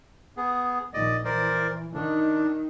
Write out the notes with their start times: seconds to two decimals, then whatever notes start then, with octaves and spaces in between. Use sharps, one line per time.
0.37 B3 G#4
0.94 A#1 D#3 D5 D#5
1.25 E3 A#4 C5 D5
1.94 D#3 D4 D#4